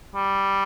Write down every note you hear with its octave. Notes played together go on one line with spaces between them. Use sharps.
G3